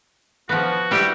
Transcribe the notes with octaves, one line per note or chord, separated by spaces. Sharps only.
F3 B3 F#4
G3 E4 G4